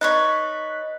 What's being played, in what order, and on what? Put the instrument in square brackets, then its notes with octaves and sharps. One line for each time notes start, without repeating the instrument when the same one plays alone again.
[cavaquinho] D#4 B4 C#5 [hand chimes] D#5 [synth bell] F#6 B6